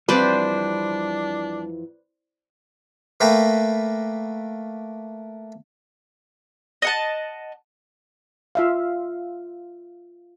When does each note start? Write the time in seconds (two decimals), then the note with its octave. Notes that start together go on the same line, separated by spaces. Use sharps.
0.09 F2 E3 G3 C4 D4 B4 C5 D5
3.20 A3 A#3 B4 G5 A#5
6.82 D#5 F#5 A5
8.55 F4 E5 F5